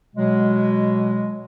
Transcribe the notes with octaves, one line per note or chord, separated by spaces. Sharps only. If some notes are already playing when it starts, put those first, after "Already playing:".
B2 F#3 G#3